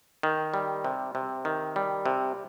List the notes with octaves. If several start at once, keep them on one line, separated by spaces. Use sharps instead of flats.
D#3
G3
C3
C3
D#3
G3
C3